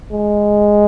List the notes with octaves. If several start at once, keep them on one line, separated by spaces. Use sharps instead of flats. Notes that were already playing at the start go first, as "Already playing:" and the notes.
G#3